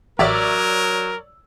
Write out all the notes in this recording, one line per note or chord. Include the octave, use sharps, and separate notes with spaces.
A1 F#3 A#4 C#5 D5 E5 E6